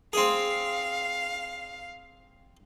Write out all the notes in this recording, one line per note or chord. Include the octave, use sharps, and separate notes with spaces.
C4 G#4 F5